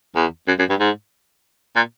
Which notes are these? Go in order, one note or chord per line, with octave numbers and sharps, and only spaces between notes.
E2
F#2
F#2
G2
G#2
A#2